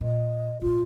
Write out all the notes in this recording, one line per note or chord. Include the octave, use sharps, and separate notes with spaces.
A#2 D#5
A#1 G#2 F4